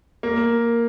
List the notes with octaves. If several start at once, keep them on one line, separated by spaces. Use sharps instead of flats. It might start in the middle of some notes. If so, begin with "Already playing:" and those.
A#3